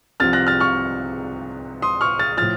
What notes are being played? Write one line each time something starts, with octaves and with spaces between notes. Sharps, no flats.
C2 C3 F3 F6 A6
F#6 A#6
F6 A6
C#6 F6
C6 D#6
C#6 F6
F6 A6
A2 F3 F6 A6